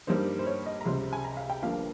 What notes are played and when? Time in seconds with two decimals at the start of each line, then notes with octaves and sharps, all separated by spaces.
0.07 G2 G3 A#3 D#4 C5
0.39 C5
0.47 C#5
0.66 D#5
0.81 A#5
0.85 C#2 C3 G3 C4 C6
1.13 G#5
1.24 A#5
1.37 F5
1.50 G5
1.62 G1 G2 F3 A#3 F5